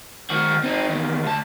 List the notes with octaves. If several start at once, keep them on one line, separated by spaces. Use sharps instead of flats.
D#3 F#4
C4 D#4
E2 D#3
D2 A5